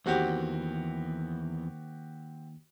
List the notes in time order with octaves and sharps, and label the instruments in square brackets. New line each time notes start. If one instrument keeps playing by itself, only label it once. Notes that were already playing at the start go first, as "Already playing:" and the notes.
[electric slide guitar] E2 [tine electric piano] D#3 A#3 [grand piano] C4 F#4 G4